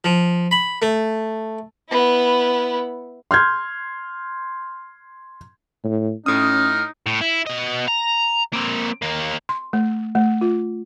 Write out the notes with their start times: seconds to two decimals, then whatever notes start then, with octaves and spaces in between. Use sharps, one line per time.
0.04 F3
0.51 B5
0.82 A3
1.89 B3 E4
3.31 C6 F6 G6 G#6
5.84 A2
6.26 A2 C#4 D#4 D#6 F6
7.07 A2
7.21 E4
7.46 B2 D#5
7.88 A#5
8.53 A#3 C4
9.02 D#2 A#3
9.49 C6
9.73 A3
10.15 A3
10.41 F4